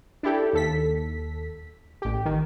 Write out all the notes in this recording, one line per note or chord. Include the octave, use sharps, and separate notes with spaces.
D4 E4 G4 A4
D#2 A4 B6
A1 G4
D#3